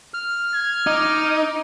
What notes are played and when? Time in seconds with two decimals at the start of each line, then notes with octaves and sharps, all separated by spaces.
0.14 F6
0.53 G#6
0.87 D#4 D6